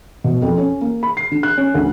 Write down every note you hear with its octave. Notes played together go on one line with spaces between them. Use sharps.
B2
F2
C#4
A#3
B5
C7
D3
F#6
C#4
D2